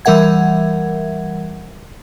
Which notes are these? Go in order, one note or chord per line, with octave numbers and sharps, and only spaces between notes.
E3 G3 A#4 E5 F#5 G#6